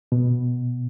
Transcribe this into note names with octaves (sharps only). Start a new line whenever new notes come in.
B2